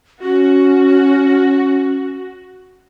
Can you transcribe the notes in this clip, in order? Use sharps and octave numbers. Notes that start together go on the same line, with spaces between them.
C#4 F#4